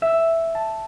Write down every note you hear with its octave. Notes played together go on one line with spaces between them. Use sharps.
E5
A5